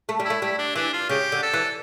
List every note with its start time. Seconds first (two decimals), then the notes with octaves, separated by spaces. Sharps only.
0.09 A3
0.20 G3
0.25 A3 E4
0.42 G3 E4
0.59 D4
0.75 E3 D4
0.93 F4
1.09 C#3 G4
1.32 D3
1.43 A4
1.54 E3